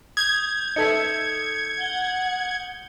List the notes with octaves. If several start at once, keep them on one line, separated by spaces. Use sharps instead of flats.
D#6 G6 G#6
D#4 A4 E5 C#7
F#5 G7